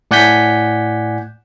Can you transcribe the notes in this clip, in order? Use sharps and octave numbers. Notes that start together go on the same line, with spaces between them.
A2 D5 F#5 G#5 G6 B6